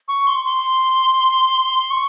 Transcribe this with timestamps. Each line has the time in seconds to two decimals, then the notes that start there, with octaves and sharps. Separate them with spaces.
0.08 C#6
0.27 C6
0.45 C6
1.90 C#6